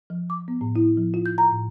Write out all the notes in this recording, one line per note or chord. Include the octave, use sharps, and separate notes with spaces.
F3
D6
B3
A2
E4
F3
F4
G6
A#5
A2